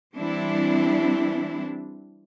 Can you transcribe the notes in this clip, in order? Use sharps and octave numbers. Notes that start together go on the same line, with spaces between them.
E3 G3 C4 D4 E4